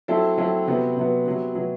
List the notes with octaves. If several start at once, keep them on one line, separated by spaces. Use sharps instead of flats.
F#3 C4 E4 A4
F#3 C4 E4 A4
C3 F#3 B3
C3 F#3 B3
C3 F#3 B3
C3 F#3 B3